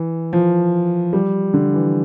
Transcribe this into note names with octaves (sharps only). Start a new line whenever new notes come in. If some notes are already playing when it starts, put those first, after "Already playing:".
Already playing: E3
F3
G3
D3
E3